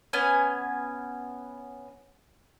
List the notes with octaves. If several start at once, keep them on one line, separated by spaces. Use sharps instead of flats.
B3 C#4 G#5